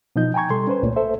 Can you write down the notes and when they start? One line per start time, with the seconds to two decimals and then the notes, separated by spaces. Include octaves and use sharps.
0.16 B2 F3 D#4 D#5 G6
0.34 G5 G#5 A#5 C#6 G#6
0.50 B2 G3 A4 C6
0.67 C#4 B4 C5
0.83 C2 A#2 A3 C#5
0.96 A4 C5 E5